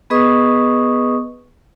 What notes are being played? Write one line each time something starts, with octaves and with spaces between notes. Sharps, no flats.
B3 G#4 B4 D#5 C#6 D#6